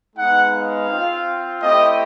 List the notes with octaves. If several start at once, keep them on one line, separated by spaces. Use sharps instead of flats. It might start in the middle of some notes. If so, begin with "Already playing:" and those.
G#3 B3 D#4 F#5
F5
C4 F4
A3 C4 E4 G4 D#5